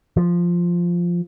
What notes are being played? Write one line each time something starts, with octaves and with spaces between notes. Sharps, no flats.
F3